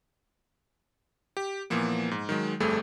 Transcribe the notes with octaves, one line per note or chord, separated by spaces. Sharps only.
G4
A#2 E3 F3 A#3 B3
G#2
D#3 F#3 G#3
G1 F2 G3 A3 G#4 A4